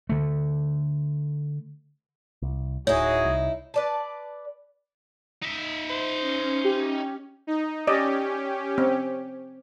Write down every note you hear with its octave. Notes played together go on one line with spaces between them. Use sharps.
D3 A3
C2
D1 A2 D#4 E4 F#4 G#4 C#5
C2
B4 D5 A5
D#4 E5
C5
C#4
G4
D#4
C#4 G4 D5 D#5
C4